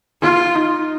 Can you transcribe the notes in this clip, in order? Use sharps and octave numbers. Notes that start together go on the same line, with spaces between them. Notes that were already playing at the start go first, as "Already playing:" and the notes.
F4
D#4